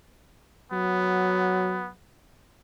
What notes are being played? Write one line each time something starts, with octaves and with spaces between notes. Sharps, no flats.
F#3 B3